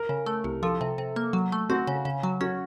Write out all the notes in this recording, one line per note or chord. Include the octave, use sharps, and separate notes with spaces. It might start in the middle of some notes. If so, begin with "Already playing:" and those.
Already playing: A#4
C#3
A3
C2
F3 A4
C3
C3
A#3
F#3
A3
C4 F#4
C#3
C#3
F#3
C#4 F#4